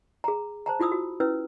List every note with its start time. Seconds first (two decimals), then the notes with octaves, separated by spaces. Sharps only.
0.24 G#4 A#5
0.66 C5 A5 A#5
0.79 E4 F4 B5 D#6 E6
0.92 F#4
1.20 C#4 E4 B4 E6